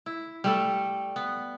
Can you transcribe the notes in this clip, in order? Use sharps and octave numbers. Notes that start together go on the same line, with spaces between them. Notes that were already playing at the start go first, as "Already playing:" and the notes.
E4
G3 A3 A4
B3